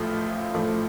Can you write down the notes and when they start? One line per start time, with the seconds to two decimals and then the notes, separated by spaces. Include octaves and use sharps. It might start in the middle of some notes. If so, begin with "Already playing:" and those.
Already playing: A1 A2 F3 A3 F4
0.54 A1 A2 F3 A3